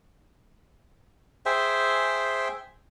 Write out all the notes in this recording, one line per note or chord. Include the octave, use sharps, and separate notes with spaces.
G#4 C5 E5 G5